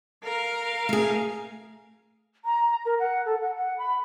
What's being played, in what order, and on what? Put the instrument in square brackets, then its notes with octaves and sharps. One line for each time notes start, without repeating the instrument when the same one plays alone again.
[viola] A#4 F5
[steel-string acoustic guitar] A3 G#4
[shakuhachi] A#5
A#4
F#5
A4
F#5
F#5
B5